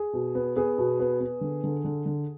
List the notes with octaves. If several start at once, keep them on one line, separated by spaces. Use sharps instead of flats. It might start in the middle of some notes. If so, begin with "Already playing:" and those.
Already playing: G#4
B2
B3
B3 G#4
B2
B3
B3
D3
D3
D3
D3